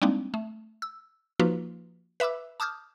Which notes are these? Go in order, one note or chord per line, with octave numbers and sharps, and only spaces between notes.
G3 G#3 A#3 C4 D4 D#4
A3
E6
F3 A#3 D#4 F4 F#4 B4
B4 E5 B5 D6 E6
A5 D6 D#6 F6 G6